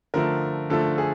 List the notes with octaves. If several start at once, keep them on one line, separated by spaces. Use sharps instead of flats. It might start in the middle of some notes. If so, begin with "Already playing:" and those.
D3 F3 A3 A#4
D3 F3 A3 A4
G#4